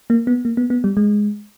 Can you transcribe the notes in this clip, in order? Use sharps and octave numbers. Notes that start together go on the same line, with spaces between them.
A#3
B3
A#3
B3
B3
G3
G#3